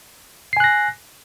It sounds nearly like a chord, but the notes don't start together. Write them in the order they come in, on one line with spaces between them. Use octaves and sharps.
C7 G#5 F#6 A#6